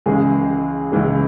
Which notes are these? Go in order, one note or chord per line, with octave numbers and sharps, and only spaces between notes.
C#2 C#3 E3 G#3 G#4
C#2 C#3 E3 G#3